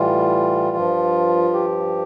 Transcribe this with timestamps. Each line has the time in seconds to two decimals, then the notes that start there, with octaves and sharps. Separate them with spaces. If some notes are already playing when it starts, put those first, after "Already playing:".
Already playing: A2 E3 G3 F4
0.77 G2 F3
1.53 G4